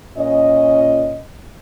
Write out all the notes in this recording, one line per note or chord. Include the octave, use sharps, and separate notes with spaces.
A#2 C#4 D#5